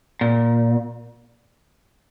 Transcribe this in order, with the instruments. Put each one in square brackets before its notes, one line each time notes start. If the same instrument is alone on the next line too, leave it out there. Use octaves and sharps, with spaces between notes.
[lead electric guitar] A#2